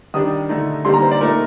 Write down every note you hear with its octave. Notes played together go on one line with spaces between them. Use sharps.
D#3 G3 D4 D#6
D3 A3 D#4
D3 G3 A#3 D#4 C6
A#5
C5
D5
A#2 A3 D#4 A#4